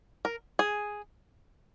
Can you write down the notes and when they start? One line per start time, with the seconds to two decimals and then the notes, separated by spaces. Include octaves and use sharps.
0.25 A#4
0.59 G#4